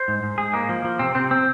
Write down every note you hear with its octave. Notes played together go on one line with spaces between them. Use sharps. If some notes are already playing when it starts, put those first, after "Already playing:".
Already playing: C5
G#2
G#2
G#2 G#4
G#3 A#3
F3
F3
C3 C4
C3 C4
C4